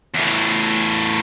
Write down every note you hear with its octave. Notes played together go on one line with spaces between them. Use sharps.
E2 A2